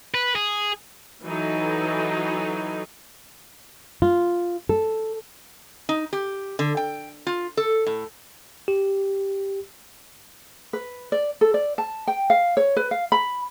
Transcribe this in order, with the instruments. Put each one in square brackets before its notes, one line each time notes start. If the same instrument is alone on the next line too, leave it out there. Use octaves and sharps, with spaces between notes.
[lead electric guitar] B4
G#4
[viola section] E3 F#3 D#4 A4
[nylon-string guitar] F4
A4
[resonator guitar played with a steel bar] D#4
G4
D3
G5
F4
A4
A2
[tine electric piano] G4
[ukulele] B4
D5
A4
D5
A5
G5
F5
C#5
B4
F5
B5